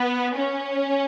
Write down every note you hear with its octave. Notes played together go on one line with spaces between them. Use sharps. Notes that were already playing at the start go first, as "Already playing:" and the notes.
Already playing: B3
C#4